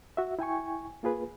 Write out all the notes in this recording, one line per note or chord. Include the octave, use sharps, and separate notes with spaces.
F#4 E5
E4 G5 G#5 C#6
A#3 F4 G#4 B4